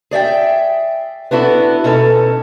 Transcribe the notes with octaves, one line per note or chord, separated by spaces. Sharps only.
G#4 D5 E5 G5
B3 D4 E4 F#4 A4
B2 C#4 D#4 A4